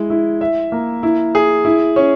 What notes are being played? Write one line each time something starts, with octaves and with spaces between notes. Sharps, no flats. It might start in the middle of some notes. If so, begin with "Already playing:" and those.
Already playing: G#3 E4
E4
E5
A#3
E4
G#4
E4
C#4